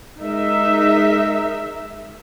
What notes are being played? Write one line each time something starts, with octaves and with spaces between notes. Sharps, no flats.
G#3 D#4 A#4 E5